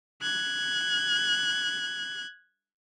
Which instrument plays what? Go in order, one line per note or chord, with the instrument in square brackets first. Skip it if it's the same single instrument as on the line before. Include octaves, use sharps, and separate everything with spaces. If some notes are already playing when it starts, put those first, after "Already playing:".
[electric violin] F#6 G#6